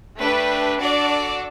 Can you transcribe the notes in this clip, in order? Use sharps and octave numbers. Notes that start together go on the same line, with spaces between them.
A3 D4 G4 B4
D4 F#4 A4 D5